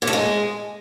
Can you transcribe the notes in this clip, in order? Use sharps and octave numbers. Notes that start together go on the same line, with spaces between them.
A#2
A3
G#3